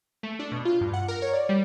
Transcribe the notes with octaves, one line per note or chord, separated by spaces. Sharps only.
A3
D4
B2
F4
G2
F#5
A#4
C#5
D5
G3